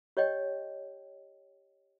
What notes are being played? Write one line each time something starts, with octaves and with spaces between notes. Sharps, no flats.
G4 C#5 D#5 G5